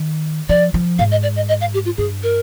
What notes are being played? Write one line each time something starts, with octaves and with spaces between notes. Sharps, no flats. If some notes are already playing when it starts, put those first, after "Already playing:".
Already playing: D#3
F3 D5
F3
G#2 F5
D#5
D5
D#5
D#5
F5
G4
F4
G2 G#4
A#4